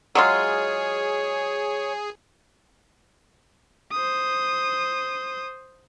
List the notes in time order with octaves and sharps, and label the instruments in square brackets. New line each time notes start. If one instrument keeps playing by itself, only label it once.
[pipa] F#3 G#3 F4 [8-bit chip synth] G#4 [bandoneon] C#5
[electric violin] C5 D#6